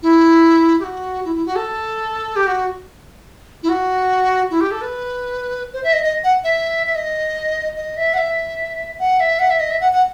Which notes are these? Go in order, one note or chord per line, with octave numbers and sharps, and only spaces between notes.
E4
G4
F#4
E4
E4
F#4
A4
G4
F#4
E4
F#4
E4
G4
A4
B4
C5
E5
D#5
D#5
F#5
E5
E5
D#5
D#5
E5
F#5
E5
F#5
E5
F#5
E5
D#5
E5
F#5
F#5